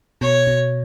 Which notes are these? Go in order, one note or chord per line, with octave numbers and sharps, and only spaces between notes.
B2 C#5
B2